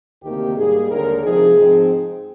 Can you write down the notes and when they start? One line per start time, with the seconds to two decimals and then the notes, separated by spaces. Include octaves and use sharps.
0.23 D2 C3 D#3 A#3 G4
0.56 G#2 G3 A#3 G#4
0.89 D#2 D3 G#3 A#4
1.22 C3 F3 C4 D#4 G#4
1.56 G#2 F3 C4 D#4